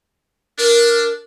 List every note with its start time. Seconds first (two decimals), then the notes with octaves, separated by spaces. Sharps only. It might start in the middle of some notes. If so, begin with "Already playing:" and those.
0.59 D4 A#4